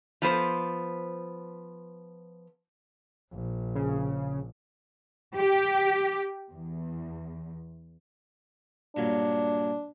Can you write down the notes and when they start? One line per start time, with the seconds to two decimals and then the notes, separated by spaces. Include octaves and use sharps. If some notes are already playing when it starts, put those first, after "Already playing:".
0.22 F3 B3 C5
3.33 A#1
3.75 C#3
5.37 G4
6.52 E2
8.97 G2 A#2 F#3 D4